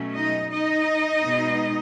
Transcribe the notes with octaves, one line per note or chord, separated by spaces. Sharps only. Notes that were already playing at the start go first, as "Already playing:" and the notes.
Already playing: B2 F#3 A3 C#4
D#4 D#5
D#4 D#5
B2 G#3 B3